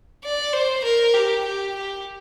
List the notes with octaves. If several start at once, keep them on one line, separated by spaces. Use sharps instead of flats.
D5
C5
A#4
G4
G4
G4